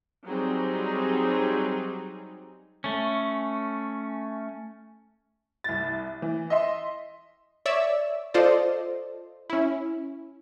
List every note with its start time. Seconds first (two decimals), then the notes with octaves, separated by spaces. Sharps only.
0.26 F#3 G3 C4 D#4 G#4
2.84 A3 C#4
5.64 C2 A6
6.22 E3
6.50 D#5 E5 C6
7.66 C#5 D5 E5 E6
8.34 F4 A4 C5 D5 D#5
9.50 C#4 E4